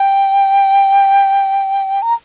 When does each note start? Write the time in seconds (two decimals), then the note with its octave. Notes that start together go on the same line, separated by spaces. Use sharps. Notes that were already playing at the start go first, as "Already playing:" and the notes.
Already playing: G5
2.02 A#5